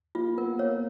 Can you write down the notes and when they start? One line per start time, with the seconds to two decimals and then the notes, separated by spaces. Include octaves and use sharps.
0.15 A#3 F4
0.38 B3 A#4
0.59 A#3 C#5